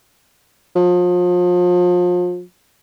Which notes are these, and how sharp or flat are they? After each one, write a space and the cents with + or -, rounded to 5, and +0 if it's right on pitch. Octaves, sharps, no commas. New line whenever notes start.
F3 +35